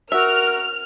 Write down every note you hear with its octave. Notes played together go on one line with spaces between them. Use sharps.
F#4 A#4 E5 F6